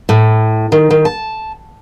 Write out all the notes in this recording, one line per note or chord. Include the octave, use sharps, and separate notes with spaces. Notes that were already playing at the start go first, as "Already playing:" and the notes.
A2
D#3
D#3
A5